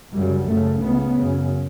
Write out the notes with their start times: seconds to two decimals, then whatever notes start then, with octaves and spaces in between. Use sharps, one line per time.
0.13 F#2 C#3 G3
0.47 F#2 C#3 A3
0.81 C#2 C#3 B3
1.15 F#2 C#3